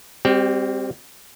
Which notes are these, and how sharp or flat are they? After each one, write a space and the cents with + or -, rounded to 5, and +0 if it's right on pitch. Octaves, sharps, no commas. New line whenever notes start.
G3 +30 C4 +0 G4 -35